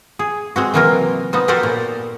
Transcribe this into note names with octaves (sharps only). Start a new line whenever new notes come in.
G#4
G#3 C4 F#4
C3 E3 F#3 A#3 F4 A#4
F3 B3 D#4
F#4 G4 A4 A#4 C5 F#5
A#2